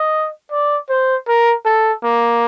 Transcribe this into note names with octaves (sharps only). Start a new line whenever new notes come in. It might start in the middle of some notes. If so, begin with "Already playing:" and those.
Already playing: D#5
D5
C5
A#4
A4
A#3